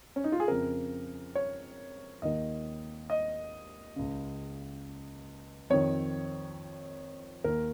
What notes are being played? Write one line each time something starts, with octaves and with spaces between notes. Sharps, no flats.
C#4
D#4
F4
G#4
F2 C#3 A#4
C#5
D#2 D#3 D#5
D#5
C#2 C#3
F2 D#3 C#5
D#2 D#3 A#4